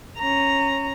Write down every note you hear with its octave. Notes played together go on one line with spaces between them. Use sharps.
C#4 A#5